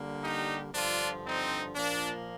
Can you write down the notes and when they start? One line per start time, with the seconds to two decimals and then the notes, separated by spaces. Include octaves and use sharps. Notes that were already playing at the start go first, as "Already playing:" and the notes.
Already playing: D3 G3 A#3
0.23 D#4 G4
0.74 G2 D3 F3 D4 F4
1.25 C4 D#4
1.75 A#2 F3 A#3 D4